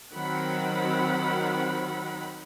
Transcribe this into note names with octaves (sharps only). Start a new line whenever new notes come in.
D#3 F#3 C4 F#5 B5